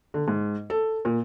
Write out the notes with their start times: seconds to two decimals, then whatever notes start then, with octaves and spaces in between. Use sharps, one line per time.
0.14 D3
0.28 G#2
0.70 A4
1.05 A#2